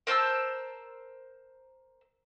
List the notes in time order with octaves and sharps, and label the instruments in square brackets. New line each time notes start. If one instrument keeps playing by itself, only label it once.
[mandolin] A#4 C5 A5 E6